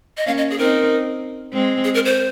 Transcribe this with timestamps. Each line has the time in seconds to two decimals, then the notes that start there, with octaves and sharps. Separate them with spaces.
0.17 D#5
0.26 A#3 C#4 F5
0.38 D#5
0.51 G#4
0.58 C4 D#4 A#4
1.53 G#3 C4
1.84 G#4
1.94 A#4
2.05 C5